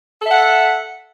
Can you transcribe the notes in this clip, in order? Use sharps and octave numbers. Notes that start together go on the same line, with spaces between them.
A4 E5 F#5